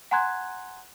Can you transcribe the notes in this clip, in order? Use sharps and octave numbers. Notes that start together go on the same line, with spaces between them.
F#5 G#5 A#5 C6 F#6 G#6